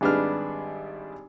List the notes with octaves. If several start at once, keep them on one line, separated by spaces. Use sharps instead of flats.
G#1 G3 D4 G#4 B4 F6